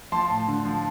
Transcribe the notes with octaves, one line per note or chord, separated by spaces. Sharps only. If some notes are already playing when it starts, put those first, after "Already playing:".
F3 A5 C6
A2
D3
F3